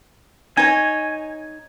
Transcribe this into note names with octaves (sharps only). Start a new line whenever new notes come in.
D#4 C#5 G#5